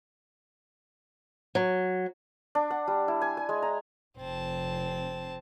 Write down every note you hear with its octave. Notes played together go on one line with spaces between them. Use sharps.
F#3
D4
F#5
G3
E4
G#5
G#5
G#3
A#5
F1 C4 A5